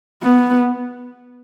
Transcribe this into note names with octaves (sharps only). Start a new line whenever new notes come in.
B3